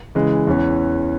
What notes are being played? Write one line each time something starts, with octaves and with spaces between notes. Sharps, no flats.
C#3 E3 G#3
E2 E3 C#4